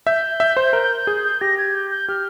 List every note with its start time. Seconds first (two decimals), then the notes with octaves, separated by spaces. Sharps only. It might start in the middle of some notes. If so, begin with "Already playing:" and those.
0.07 E5 G6
0.40 E5
0.57 C5
0.73 A#4
1.07 G#4
1.41 G4 A#6
1.58 G#6
1.75 G6
1.91 G6
2.08 G4 F6